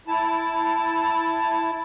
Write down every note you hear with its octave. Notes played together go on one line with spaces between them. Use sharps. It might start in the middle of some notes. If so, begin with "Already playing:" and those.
E4 A5